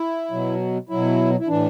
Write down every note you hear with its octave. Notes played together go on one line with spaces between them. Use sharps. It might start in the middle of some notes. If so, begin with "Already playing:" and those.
Already playing: E4
B2 F#3
B2 F#3 E4
E4
A2 E3 D4